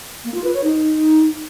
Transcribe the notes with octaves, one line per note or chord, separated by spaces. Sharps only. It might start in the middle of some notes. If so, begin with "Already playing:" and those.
A#3
F4
B4
C#5
D#4